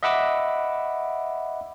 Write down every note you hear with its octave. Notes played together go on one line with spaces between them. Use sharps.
D#5 E5 F#5 B5 D6 E6